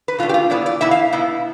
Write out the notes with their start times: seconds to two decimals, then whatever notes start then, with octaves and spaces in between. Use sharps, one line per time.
0.08 B4
0.18 B2 A3 D4 F4
0.29 G4
0.34 F4
0.50 B2 B3 E4 D5
0.66 D5
0.81 B2 B3 E4 E5
0.91 F5
1.13 B2 B3 E4